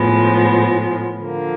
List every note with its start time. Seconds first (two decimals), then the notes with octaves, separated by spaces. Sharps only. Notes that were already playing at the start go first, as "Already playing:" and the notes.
Already playing: A2 F3 G#3 B3
1.21 D3 F3 A#3